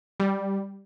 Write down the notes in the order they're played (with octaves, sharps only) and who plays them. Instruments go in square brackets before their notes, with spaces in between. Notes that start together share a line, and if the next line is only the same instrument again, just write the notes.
[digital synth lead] G3